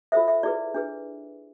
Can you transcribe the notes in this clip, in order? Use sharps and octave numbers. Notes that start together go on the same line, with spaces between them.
F4 A4 C5 E5
E5
E4 G#4 B4 D5
D4 G#4 B4